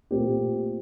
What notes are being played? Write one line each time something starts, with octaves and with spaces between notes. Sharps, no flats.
A#2 A3 C4 G4